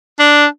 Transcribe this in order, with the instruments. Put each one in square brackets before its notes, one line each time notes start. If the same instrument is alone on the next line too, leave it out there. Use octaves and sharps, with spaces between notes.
[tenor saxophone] D4